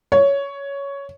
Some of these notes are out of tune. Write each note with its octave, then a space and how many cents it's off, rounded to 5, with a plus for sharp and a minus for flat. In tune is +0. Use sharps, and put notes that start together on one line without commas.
C#5 +10